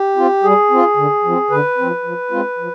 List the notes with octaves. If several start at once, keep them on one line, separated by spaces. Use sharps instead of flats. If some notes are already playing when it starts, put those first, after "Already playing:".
Already playing: G4
C4 F4
G3 G#4
C4 F4
D3
F3 C4
D3 B4
F3 C4
F3
G#3 C4 F4
F3